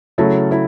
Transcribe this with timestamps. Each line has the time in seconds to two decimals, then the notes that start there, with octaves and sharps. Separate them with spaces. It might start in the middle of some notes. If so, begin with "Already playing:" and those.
0.18 C#3 F#3 A3 E4 A4
0.51 E4 A4